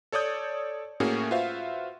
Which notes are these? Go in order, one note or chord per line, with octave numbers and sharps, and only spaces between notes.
A4 C#5 D5 D#6 G6
A2 A#3 C#4 F#4 G#4
F4 F#4 B4 C5 E5 F5